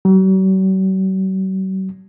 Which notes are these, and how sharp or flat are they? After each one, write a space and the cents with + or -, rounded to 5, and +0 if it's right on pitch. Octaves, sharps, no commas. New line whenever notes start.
F#3 +45